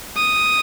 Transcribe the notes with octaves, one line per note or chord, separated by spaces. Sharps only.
D#6